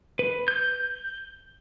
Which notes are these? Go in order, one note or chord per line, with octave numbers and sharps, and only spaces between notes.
B4
G6